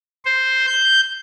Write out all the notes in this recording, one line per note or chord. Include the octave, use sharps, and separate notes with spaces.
C5
G6